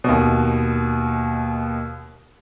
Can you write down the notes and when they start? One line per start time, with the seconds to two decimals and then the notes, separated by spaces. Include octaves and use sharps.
0.04 D#2 B2